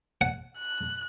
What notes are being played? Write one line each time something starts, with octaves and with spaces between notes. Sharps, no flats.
F#5
F#6